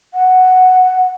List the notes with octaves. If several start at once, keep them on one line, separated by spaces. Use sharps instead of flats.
F#5